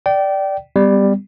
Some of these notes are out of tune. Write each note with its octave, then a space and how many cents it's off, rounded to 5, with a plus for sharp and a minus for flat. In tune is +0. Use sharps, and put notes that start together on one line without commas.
D5 +0 G5 -25
G3 +10 B3 +25